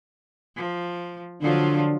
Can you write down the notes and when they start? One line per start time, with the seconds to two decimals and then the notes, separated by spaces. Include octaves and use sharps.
0.56 F3
1.42 D3 F3 F#3 D4 F4